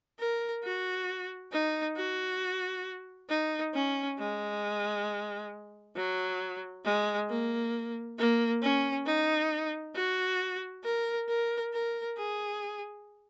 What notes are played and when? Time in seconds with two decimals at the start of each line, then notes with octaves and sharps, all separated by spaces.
0.19 A#4
0.64 F#4
1.52 D#4
1.96 F#4
3.30 D#4
3.74 C#4
4.19 G#3
5.96 F#3
6.85 G#3
7.30 A#3
8.18 A#3
8.62 C#4
9.06 D#4
9.95 F#4
10.84 A#4
11.28 A#4
11.73 A#4
12.17 G#4